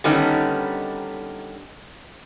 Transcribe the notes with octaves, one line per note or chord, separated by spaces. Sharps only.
D3 D#3 G3 B3 C#4 D#4